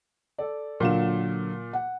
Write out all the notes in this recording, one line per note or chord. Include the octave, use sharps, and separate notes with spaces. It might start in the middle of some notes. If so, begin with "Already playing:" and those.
A4 D5
A#2 D3 F#3 F4 E7
F#5